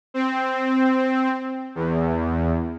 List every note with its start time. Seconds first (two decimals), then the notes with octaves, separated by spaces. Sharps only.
0.14 C4
1.75 E2